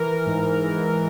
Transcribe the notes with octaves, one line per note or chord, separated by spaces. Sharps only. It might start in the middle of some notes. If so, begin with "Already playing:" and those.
Already playing: E3 A#4
G#2
E3